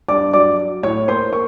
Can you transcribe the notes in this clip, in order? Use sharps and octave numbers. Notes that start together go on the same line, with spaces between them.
G2 D5 D6
F#3 D5 D6
F#3
A2 C#5 C#6
A#3 C5 C6
A#3 C#6